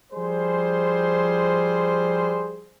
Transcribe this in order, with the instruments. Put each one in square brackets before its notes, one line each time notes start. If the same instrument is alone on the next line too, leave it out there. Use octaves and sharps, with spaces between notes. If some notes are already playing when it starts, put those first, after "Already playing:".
[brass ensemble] F3 G3 G#4 C5